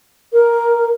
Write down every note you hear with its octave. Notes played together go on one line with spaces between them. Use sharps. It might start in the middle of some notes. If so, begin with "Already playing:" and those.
A#4